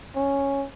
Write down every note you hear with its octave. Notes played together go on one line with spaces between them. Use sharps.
C#4